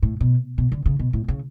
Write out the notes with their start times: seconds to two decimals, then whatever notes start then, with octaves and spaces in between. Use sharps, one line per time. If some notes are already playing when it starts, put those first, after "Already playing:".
0.03 A2
0.21 B2
0.58 B2
0.72 D3
0.86 C#3
0.99 B2
1.13 A2
1.28 C#3